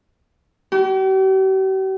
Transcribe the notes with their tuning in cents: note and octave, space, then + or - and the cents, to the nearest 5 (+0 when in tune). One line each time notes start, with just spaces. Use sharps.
G4 -45